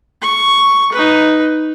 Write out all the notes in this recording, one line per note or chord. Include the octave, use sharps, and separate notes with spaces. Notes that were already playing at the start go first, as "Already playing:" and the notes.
C#6
D#4 B4